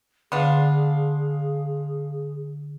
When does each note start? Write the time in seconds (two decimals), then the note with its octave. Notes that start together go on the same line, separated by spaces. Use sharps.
0.32 D3 B3 D4 G#4 F5 C6